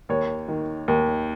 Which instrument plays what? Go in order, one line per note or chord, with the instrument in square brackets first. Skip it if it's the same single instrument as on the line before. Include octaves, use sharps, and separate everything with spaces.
[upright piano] D#2 C#5
D#3
D#2